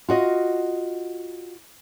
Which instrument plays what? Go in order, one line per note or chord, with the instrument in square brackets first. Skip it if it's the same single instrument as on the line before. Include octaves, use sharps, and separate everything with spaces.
[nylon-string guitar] F4 F#4 D#5